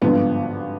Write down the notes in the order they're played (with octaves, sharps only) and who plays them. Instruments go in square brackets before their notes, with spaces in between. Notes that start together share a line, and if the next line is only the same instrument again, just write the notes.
[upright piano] G#1 G2 D3 F3 B3